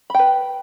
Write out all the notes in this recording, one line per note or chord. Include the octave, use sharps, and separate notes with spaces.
B4 G5 B5